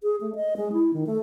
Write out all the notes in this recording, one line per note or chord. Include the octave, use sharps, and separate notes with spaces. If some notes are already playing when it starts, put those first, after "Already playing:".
G#4
A3
D#5
G#3
E4
D#3
A3